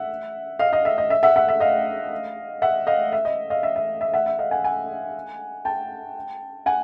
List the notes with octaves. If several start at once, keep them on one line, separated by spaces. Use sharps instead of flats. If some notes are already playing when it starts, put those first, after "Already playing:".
Already playing: E5 F#5
D#5 F5
D#5 F5
E5
D#5
E5
E5 F#5
E5 F#5
E5
D#5 F5
E5 F#5
D#5 F5
E5
D#5
D#5 F5
E5
E5
E5
E5 F#5
E5
D#5 F5
F#5 G#5
F#5 G#5
G5 A5
F#5 G#5